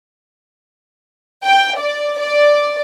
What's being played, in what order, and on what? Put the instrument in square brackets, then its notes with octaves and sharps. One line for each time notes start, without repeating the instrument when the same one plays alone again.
[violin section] G5
D5
D5